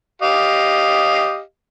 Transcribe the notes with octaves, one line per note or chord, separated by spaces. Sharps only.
G4 D#5 F5